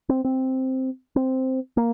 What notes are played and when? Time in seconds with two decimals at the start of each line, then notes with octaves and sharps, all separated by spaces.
0.09 C4
0.25 C4
1.16 C4
1.77 A#3